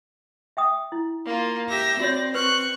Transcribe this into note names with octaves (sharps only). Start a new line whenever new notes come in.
E5 G5 D#6
E4
A#3 F4
G4 E5 A#6
C4 F#4 C#5 D5
B4 C#6 F#6